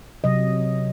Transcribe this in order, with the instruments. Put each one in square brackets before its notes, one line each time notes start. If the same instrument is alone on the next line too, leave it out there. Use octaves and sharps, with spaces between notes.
[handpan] C3 F#3 D#5